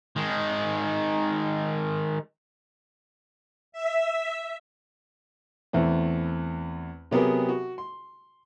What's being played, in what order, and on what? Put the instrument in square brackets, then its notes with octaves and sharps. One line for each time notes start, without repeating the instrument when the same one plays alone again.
[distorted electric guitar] D#3 G#3
[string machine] E5
[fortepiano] E2 E3 A3 C4
C3 F#3 B3 G4 G#4 A#4
F#4
C6